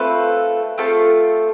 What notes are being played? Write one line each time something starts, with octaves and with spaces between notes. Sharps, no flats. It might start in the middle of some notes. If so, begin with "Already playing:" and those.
Already playing: A3 C4 F4 A4 B4
A3 C4 F4 A4